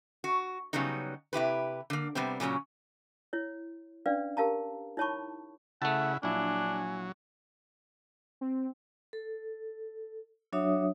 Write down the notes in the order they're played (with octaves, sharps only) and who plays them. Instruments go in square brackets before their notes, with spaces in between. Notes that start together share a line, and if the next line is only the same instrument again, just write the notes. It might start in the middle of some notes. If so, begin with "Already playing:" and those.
[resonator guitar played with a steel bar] F#4
C#3 F#3 G3 B3 D#4
C3 E4 G4 B4
D3 A#3
C3 G3 B3 C4
A#2 C#3 F#3 C#4
[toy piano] E4 C#5
C#4 D4 B4 D5 F5
G4 A#4 F5 A5 A#5
D#4 E4 C#5 A5 B5 C#6
[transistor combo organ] C#3 E4 [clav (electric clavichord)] A3 A5 [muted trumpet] F#5
[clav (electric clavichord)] A#1 E4 [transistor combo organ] F#3 [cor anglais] D4 [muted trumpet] G#5
[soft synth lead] C4
[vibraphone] A4
F#3 D4 F#4 C#5 E5 D#6